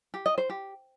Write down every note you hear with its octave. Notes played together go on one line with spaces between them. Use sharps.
G4
D#5
C5
G4